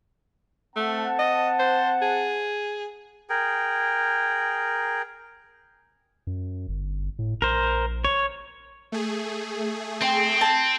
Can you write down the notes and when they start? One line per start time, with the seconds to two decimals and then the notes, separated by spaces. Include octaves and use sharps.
0.76 A3 C4 F#5 A5
1.19 D#5
1.59 C5
2.02 G#4
3.30 G#4 A#4 G5
6.27 F#2
6.69 G1
7.19 A2
7.42 A#1 A#4 C5
8.05 C#5
8.92 A3 G#4
10.01 C4 G5 C6
10.41 A5